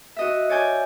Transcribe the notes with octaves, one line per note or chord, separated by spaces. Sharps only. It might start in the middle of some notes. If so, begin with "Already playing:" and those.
F#4 D#5 E5
C#5 D5 G#5 G6